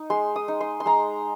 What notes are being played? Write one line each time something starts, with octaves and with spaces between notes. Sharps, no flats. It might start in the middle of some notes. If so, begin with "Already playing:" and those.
Already playing: D#4
G#3 C6
D#6
D#4
C6
C6
G#3 A#5